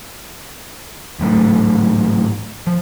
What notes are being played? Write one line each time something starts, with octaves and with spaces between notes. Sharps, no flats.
A1 G#2 F#3 A3
F3